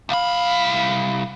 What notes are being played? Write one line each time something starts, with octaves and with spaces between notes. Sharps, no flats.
C2 F5 B5